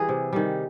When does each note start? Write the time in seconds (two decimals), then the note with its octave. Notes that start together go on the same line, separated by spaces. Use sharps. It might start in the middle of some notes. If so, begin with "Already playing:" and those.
Already playing: E3 G3 G#4
0.09 C3
0.33 D#3 G3